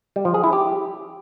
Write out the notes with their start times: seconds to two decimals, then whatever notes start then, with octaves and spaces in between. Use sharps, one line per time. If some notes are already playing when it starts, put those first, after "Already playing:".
0.16 G3
0.25 F3
0.34 G#4
0.44 E4
0.53 G4